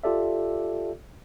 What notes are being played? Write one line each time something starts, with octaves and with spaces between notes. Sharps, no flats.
F4 G4 A4 D5 E5